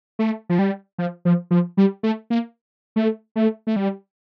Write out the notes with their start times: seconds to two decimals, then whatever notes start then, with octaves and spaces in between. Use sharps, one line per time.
0.19 A3
0.49 F3
0.59 G3
0.98 F3
1.25 F3
1.51 F3
1.77 G3
2.03 A3
2.30 A#3
2.96 A3
3.36 A3
3.67 A3
3.76 G3